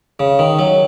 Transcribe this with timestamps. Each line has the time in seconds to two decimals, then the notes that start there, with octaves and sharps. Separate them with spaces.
0.20 C#3
0.39 D#3
0.59 F#3